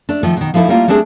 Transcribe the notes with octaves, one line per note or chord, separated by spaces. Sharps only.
A3 D4
D#3 F3 A3
B2 D#3
F3 A3 D#4 E4 A4
G3 A3 A#3 E4 F4
G3 A3 C4 D4 G#4